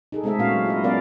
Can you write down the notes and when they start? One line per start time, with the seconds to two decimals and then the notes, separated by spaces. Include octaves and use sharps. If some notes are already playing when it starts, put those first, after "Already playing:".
0.12 D#4 G#4 A4
0.24 G#3 A3 C4 G#4 A4 E5
0.39 A#2 A#3 C#4 F#4 F5
0.53 F#3
0.65 E4 F4 D#5
0.83 F#3 B3 C#4 A#4 D5 F5